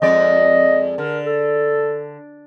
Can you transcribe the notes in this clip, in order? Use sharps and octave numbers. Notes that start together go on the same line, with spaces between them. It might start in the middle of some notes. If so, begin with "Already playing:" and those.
F2 G#3 D5 D#5
D3 A#4
A4